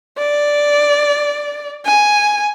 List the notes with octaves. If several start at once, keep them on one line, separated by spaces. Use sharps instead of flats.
D5
G#5